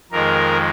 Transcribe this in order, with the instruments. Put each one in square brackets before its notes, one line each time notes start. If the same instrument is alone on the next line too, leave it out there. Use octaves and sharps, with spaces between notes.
[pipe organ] F2 D#3 G#3 A#4